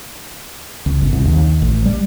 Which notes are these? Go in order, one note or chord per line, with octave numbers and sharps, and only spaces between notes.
C#2
G1
C2
D#2
A1
G3